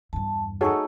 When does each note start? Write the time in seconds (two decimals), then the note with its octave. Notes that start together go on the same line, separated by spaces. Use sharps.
0.13 E2 G2 A5
0.61 A3 D#4 F#4 G#4 A4 C#5 D#5